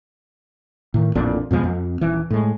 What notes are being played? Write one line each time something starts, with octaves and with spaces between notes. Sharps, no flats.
A2 D#3
A1 F2 A#2 D4
F2 B2 F3 G#3
F2
D#1 E3
A2 G#3